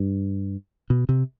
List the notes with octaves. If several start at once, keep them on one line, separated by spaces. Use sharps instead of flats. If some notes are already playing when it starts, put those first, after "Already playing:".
Already playing: G2
B2
C3